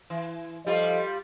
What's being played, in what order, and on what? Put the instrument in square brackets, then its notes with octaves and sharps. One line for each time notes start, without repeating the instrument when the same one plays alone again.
[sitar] E3
[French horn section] F3 A4 D#5 [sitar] G3 F4